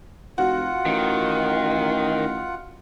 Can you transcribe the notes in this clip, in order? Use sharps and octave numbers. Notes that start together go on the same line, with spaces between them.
F1 F4 F#4 F#5
A1 D#3